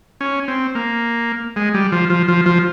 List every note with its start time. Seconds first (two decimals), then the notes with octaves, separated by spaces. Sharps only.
0.21 C#4
0.48 C4
0.75 A#3
1.56 G#3
1.74 G3
1.92 F3
2.10 F3
2.28 F3
2.46 F3